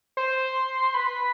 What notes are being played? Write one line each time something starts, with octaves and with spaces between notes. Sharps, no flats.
C5
B4